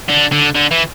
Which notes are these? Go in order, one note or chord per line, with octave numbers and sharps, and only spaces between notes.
D3
D3
D3
E3